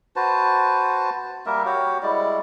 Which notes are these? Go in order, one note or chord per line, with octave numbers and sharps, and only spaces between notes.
F#4 B4 C5 A5
G3 A#3 A#4 E5
F#4 G4 C#5
G3 G#3 E4 D5